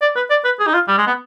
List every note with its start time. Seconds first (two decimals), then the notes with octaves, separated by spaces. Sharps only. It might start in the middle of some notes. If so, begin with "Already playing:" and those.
0.02 D5
0.16 B4
0.30 D5
0.45 B4
0.60 G#4
0.67 D#4
0.74 F4
0.88 G3
0.98 G#3
1.07 B3